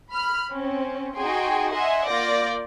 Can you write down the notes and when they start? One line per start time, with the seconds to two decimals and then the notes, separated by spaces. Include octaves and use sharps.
0.12 B5 F6
0.51 C4 C#4
1.16 D#4 F#4 G#4 G5 G#5 C6
1.73 D#5 E5 F#5 G#5 C6
2.09 A#3 F4 D5 G6 A#6